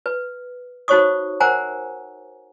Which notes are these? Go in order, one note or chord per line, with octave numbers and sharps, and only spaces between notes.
B4
D#4 F#4 C5 C#5 C#6 D#6
A#4 C5 F#5 G#5 A#5